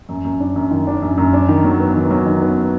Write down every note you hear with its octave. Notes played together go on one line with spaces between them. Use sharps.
F#2
F#2
D4
F#2
D#3
D4
F#2
F#2
D4
D#3
F#3
B3
D#3
F#3
D#3
B3